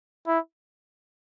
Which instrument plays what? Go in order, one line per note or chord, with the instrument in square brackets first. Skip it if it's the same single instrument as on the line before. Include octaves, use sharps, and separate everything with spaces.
[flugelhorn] E4